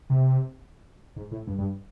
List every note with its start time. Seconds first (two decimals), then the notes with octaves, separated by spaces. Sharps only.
0.10 C3
1.16 G#2
1.32 A2
1.47 G2
1.59 G2